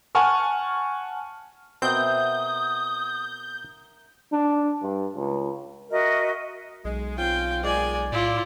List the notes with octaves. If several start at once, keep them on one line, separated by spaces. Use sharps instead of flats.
F#5 G#5 A5 C#6 F6
B2 C4 A#4 E5 F#5 D#6 G6
D4
G2
C#2
F#4 A#4 D#5 E5
B1 G#3
C4 C#4 F4 G5
A#2 G#3 D5 G#5
A2 E4 F4 D5